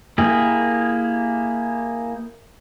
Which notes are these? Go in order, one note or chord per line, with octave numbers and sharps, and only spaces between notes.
A#3 E4 G4 G#4